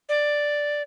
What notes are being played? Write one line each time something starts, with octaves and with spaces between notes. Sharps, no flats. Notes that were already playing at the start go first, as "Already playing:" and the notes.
D5